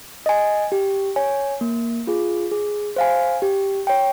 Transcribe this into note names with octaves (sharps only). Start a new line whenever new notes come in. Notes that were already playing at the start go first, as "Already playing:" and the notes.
D#5 G#5
G4
C#5 G#5
A#3
F4 G#4
G#4
C5 F5 G#5
G4
C#5 G5